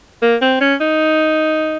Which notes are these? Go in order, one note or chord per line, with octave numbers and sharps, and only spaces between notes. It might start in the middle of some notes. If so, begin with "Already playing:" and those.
A#3
C4
C#4
D#4